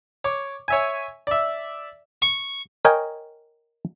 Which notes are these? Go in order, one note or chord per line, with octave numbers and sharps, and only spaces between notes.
C#5 D6
C#5 E5 G#5
D5 E5
C#6
A#4 C#5 D#5 G5 G#5